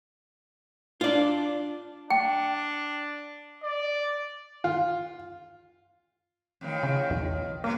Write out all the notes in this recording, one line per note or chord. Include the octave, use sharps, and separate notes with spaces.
D4 F4 D5
D4 G5
D5
F4
F2 A2 D#3
C#3
B1 E2
F#3 G3 A#3 B3